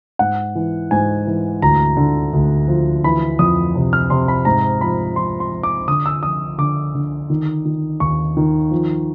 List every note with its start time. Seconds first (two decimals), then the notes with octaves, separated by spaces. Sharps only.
0.19 G#2 F#5
0.55 E3
0.91 G#2 G#5
1.27 E3
1.62 D2 A#5
1.97 D3
2.33 D2
2.68 F3
3.04 E3 B5
3.39 F2 D#6
3.75 C3
3.93 F6
4.10 C3 C6
4.28 B5
4.45 G#2 A#5
4.81 F3 B5
5.16 F3 C6
5.40 C6
5.52 F3
5.63 D6
5.88 D3 D#6
6.06 E6
6.23 F3 D#6
6.58 D3 D6
6.95 D3
7.30 D#3
7.65 D#3
8.00 D#2 C#6
8.37 D#3
8.71 F3